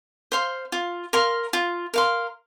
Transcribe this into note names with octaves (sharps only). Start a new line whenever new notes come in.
C5 F5 C6
F4
A#4 F5 C6
F4
A#4 F5 C6